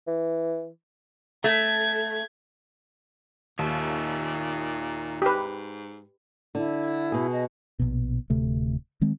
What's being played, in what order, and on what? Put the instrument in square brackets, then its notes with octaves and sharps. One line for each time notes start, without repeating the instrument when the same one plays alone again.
[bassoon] E3
[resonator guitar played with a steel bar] A3 [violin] G#6
[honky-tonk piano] D#2 [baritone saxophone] A#2 [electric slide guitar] D#4 C#5 E5
[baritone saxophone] G#2 [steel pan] G4 B4
[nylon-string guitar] D3 [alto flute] E4
[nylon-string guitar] B2 G#4
[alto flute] D#5
[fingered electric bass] A#1 B2
D1 D2 C3 A3
D#3 G#3 C4